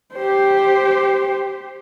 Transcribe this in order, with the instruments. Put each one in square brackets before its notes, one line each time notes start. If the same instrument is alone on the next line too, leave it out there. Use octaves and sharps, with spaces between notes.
[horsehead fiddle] G4 C5